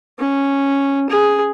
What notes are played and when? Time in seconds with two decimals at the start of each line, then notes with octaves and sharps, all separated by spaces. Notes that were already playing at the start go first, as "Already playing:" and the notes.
0.19 C#4
1.10 G#4